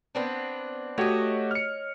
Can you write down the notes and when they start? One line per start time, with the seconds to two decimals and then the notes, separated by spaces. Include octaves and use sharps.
0.15 B3 C4 D4
0.98 A3 F#4 G4 C#5 D#5
1.51 F6 C#7